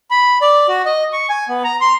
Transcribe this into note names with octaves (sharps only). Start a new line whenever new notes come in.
B5
D5
F#4
D#5
C#6
G#5
B3
A#5
C6